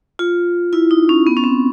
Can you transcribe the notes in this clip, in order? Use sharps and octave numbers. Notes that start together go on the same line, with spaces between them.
F4
E4
D#4
C#4
B3
C#4
C4